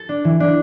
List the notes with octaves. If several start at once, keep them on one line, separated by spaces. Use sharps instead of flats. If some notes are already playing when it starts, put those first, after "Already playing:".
Already playing: A4
D4
E3
D4